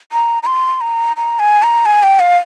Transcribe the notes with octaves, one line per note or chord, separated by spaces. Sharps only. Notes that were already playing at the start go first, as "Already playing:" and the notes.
A#5
A#5
C6
A#5
A#5
G#5
A#5
G#5
G5
F5